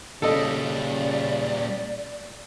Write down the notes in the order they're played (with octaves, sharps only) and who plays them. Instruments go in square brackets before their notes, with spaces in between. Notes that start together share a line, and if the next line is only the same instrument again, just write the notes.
[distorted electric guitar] A#2 G3 [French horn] C#3 [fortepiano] A4 D#5 [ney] D5